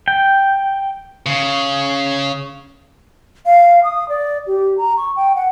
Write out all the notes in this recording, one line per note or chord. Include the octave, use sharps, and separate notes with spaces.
G5
C#3
F5
D#6
D5
G4
A#5
C#6
G5
F#5